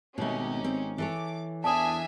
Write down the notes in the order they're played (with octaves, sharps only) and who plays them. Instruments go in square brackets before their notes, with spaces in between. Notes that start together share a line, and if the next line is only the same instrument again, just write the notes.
[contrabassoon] G#1 [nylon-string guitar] B2 A3 [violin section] C#4 D#4 G4
[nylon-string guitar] C4
[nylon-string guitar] E3 A4 C#5 [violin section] D6
[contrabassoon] E2 [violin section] D4 E5 G#5 [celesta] A5 D#6